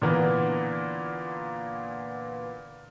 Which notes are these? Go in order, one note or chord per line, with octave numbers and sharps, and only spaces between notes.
A#2 D3 E3 A#3 B3